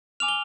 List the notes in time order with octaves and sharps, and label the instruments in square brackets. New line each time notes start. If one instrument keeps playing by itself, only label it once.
[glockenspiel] G#5 D6 F6 F7
G7